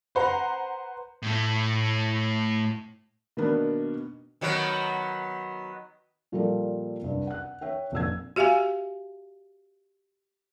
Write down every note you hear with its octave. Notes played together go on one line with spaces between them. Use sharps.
B4 C5 F#5 A#5
A2 A3
B2 D#3 A#3 B3 D4
D#3 F#3 B3
A#2 F3 G3 A#3 A4
C2 G2 C3
F#5 F#6
C#5 E5 G5
F1 A#1 E6 G#6
F#4 G4 E5 F5 G#5